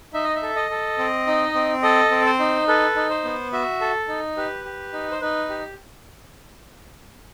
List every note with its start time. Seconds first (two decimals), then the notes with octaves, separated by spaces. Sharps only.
0.14 D#4 E5
0.24 D#5
0.35 E5
0.43 A4
0.56 D#5
0.70 A4
0.98 C4
1.27 D#4
1.54 C4
1.83 A4 D#5
2.11 C4
2.26 C5
2.39 D#4
2.68 A4 B4
2.96 D#4
3.10 C5
3.24 B3
3.53 F#4 E5
3.81 A4
4.08 D#4
4.37 G4 B4
4.65 G4
4.93 D#4
5.12 C5
5.21 D#4 B4
5.50 G4